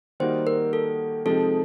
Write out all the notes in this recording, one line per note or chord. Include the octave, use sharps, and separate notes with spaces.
D#3 G3 A#3 D#4 F#4 C5
A#4
A4
C3 F3 G#3 C4 D#4 A4